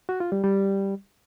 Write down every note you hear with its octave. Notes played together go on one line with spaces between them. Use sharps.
F#4
F4
G3
G3